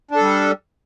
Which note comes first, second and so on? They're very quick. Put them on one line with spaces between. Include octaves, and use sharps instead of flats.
D4 A4 G3